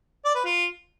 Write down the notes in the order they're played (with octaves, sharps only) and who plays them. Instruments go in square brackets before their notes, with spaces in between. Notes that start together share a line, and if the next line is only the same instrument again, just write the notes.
[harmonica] D5
B4
F4